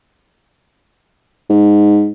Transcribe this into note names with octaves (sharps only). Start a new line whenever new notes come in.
G#2